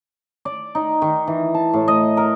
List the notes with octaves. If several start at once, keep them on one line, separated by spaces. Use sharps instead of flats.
D5
D#4
D#3
E3
A5
A2
D#5
A#4